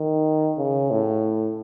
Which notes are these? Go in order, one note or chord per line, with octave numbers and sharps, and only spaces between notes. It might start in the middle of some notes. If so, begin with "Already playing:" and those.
Already playing: D#3
C#3
A2